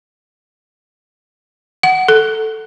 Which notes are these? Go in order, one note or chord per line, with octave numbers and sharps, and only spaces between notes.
F#5
A4